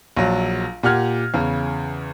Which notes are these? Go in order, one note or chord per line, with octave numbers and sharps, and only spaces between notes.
A#1 F#3
A#2 G4 F#5 F6 G#6
E2 C#3